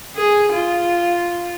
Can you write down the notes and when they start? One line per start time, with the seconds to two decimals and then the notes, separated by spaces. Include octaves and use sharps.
0.16 G#4
0.54 F4